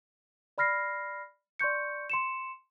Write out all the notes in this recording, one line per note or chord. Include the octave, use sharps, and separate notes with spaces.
D5 B5 F6 A#6 C7
D5 C6 C#6 G6 C#7
C6 C#7 E7